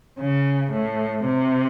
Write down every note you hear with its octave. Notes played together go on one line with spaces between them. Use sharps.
C#3
A2
C3